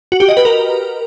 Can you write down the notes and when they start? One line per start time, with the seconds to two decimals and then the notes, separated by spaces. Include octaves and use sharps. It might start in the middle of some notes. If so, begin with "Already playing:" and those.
0.12 F#4
0.20 G4
0.29 D#5
0.37 B4
0.45 A#4